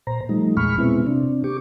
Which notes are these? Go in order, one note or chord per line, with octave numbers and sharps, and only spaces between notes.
A#2 C5 A#5
F3 G3 A3 D#4
E2 A#2 G#3 B5 C#6 F6
B2 G#3 B3 C4 E4
C3 C4 D4
G4 C#6 D6